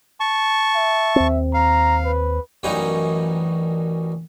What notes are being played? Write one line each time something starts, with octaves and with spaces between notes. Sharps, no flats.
A5 C#6
E5
D#2 C4
F5 A#5
B4
A1 F#2 E3 G3 D#4 C#5